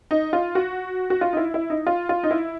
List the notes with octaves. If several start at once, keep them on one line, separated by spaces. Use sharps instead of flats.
D#4
F4
F#4
F#4
F4
D#4
E4
E4
D#4
F4
F4
D#4
E4